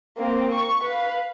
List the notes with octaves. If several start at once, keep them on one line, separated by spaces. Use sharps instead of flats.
A#3 C4
C#6
B4 F5